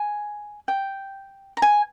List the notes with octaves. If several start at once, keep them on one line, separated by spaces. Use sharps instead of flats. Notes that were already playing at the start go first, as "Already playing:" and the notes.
Already playing: G#5
G5
A#5
G#5